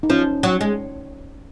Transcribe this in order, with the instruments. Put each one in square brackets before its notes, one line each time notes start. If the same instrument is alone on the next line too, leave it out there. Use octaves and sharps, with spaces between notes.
[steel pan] D#4
[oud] F3 [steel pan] C#4
[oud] F#3
G#3